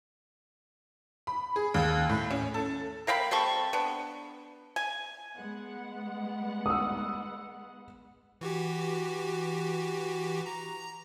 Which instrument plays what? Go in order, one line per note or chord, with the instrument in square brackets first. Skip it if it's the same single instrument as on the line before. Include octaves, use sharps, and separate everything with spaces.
[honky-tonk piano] B5
G#4
D#2
A2
C#4
A4
[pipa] A#4 F5 G5 B5
G3 C4 A4 C#6
B3 D4
G#5
[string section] G#3 B3 F#5
[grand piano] D#6 E6
[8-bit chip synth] E3 F#4 G4
A#5